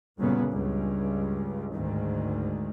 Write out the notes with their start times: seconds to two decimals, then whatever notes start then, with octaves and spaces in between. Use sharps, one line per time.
0.18 G1 F#2 A#2 C#3 B3
0.51 C#2 G2
1.72 G#1 D2 G#2 D#3